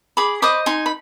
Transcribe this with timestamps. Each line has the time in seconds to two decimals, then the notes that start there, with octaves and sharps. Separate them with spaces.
0.17 G#4 B5 D6
0.42 C5 D#5 B5 D6
0.66 D#4 G#5 C6
0.86 B5